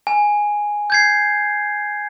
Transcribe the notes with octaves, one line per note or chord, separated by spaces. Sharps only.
G#5
G6 G#6 C7